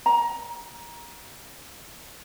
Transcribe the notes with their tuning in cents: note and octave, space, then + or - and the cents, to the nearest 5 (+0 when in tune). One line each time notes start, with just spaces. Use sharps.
A#5 +20